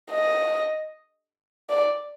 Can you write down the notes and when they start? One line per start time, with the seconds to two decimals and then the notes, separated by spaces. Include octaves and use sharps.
0.11 D#5
1.70 D5